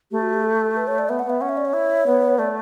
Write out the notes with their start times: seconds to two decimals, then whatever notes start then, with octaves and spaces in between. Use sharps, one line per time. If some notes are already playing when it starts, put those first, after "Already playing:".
0.11 A3 G4
0.22 F#4
0.33 G4
0.44 A4
0.77 B4
0.87 C#5
0.98 D5
1.09 B3 E5
1.19 F#5
1.25 B3 E5
1.41 C#4 F#5
1.49 E5
1.57 D5
1.65 C#5
1.73 E4
2.06 B3
2.38 A3 D5